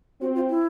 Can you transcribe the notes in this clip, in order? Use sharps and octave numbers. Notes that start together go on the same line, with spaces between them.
C4 F#4
F4
E4